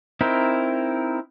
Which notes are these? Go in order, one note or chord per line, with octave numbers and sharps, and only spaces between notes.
C4 D#4 E4 A#4